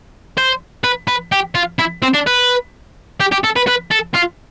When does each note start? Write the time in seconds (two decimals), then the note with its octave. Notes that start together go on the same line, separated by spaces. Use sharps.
0.38 C5
0.84 B4
1.08 B4
1.32 G4
1.55 F4
1.79 E4
2.02 C4
2.14 D4
2.26 B4
3.20 G4
3.32 G4
3.44 A4
3.56 B4
3.67 B4
3.91 A4
4.14 F4